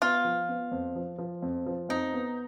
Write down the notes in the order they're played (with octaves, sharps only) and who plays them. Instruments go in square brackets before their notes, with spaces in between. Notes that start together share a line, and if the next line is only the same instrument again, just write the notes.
[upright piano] B3 [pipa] F4
[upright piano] F3
B3
F2
F3
F3
F2
F3
[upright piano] F2 [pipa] D#4
[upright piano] B3